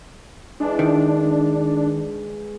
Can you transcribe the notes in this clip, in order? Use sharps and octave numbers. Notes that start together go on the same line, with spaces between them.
E3 G#3 D4
D#3